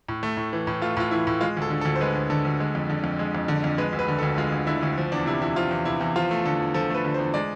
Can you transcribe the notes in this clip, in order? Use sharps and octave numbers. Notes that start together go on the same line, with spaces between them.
A2
A3
A2
E3
A2
A3 F4
A2 F4
E3 E4
A2
G#3 F4
D2 A4
D3
A4
D2
C5
G#3 B4
D2
D3 A4
D2
G#3
F2
D3
F2
G#3
F2
D3
F2
G#3 B4
D2
B4
D3
A4
D2
G#3 F4
D2
D3 E4
D2
F3
E2 D4
C3 E4
E2 E4
F3 F4
E2
C3 E4
E2
F3 F4
A3
D3 A4
E2
F3 A4
A3 B4
D3
C5
E2
G#3 D5